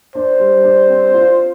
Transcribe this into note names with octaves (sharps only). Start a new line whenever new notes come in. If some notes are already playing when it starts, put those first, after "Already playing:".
D4 C5
G3
D4
C4
F4